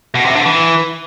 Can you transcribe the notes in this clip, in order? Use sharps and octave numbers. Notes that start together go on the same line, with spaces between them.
B2
C3
D3
E3